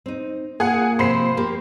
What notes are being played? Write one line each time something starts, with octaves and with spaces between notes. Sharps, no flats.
C4 D#4
A#3 F4 G#4 F#5
C3 F3 C5 B5 C7
A#3 G4 A#4